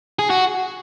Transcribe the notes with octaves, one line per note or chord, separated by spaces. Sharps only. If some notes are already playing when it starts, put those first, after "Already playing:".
G#4
F#4